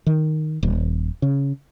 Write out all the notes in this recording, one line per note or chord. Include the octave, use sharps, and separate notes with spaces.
D#3
D#1
C#3